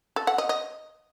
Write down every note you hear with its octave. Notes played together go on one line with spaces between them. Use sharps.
A4
F#5
D#5
D#5